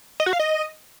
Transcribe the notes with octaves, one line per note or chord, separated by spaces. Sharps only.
D#5
F#4
F5
D#5